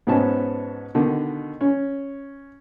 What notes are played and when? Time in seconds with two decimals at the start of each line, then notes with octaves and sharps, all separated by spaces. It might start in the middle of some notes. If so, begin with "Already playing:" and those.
0.07 G#2 B2 B3 C#4 A5
0.95 B2 D3 D#3
1.61 C#4